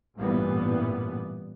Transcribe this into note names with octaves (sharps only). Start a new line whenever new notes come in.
A1 G2 A#2 E3 G3 B3